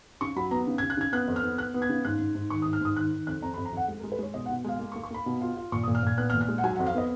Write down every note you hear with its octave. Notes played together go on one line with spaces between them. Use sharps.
C#3 C#6
F#3 B5
B3 A#5
C#3
G#6
C#3
F#6
C#3 G#6
B3 F#6
F2
F6
B3
B3 F#6
B3
G#6
C#3
G#2 F#6
G#2
G#2
D#3 C#6
D#6
G#2
F6
G#2 D#6
D#3 F#6
D#3
F2 F#6
F2 A#5
B5
F2
A#5
F2 F#5
G#3
A#4
G#3
B4
G#3 C#5
B2 D#5
F#5
B2
G#3 F5
A#3
C#6
A#3
C#6
A#3 B5
B2
F4
F4
A#2 C#6
D#6
A#2
F6
A#2 G#6
B3 F#6
F6
A#2
F6
G#3
F#5
F#3 G#5
F#5
F2
F5
B3 D#5